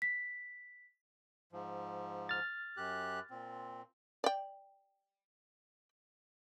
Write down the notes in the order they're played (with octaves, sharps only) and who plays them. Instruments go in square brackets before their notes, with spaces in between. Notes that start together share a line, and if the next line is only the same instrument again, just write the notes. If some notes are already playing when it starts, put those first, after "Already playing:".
[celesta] B6
[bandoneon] G#2 F3
[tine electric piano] F6 A6
[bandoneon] F#2 G4 F#6
A#2 C4
[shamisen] D5 G5